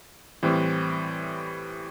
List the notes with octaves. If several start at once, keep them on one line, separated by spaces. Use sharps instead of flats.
A2 E3 G3 C4